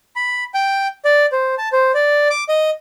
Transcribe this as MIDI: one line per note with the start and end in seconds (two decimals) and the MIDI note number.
0.16 0.44 83
0.54 0.88 79
1.05 1.26 74
1.32 1.55 72
1.58 1.69 81
1.72 1.92 72
1.94 2.28 74
2.30 2.44 86
2.49 2.70 75